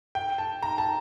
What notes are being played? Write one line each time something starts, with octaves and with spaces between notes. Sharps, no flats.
G5
A5
A#5
A5